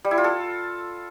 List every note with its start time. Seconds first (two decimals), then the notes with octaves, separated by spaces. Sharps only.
0.05 G3
0.11 E4
0.18 F4
0.24 A4